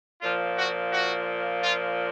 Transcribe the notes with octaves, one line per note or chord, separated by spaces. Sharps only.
A#2 F3 F4
F#4
F#4
F4